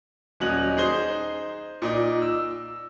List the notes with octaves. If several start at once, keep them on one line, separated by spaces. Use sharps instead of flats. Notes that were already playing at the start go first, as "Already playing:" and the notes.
D#1 F#3 C#4 D#5 F#6 F#7
D#4 G#4 C5 G7
A#2 D#4 D5
E6